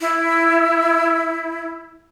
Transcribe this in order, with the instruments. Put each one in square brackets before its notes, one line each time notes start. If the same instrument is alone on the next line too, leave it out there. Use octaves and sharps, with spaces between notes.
[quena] E4